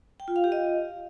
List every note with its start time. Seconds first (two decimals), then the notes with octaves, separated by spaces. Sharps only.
0.20 G5
0.28 F4
0.36 F5
0.44 G4
0.52 D#5